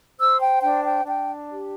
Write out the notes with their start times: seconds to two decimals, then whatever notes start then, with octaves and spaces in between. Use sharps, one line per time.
0.18 C5 E6
0.40 G5
0.61 D4 G5
0.83 G5
1.06 D4 G5
1.49 G4